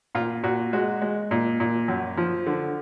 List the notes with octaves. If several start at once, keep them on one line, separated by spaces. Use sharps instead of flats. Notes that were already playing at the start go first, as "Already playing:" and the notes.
A#2 F4
A#2 F#4
G#3 F#4
G#3
A#2
A#2
F#2
F3
D3